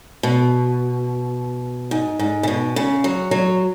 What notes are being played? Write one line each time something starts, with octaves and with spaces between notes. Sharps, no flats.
B2
G#2
G#2
C#3
B2
C#3
F#3
F#3